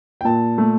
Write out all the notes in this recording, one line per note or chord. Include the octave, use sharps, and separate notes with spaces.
G5
A#2 A5
A3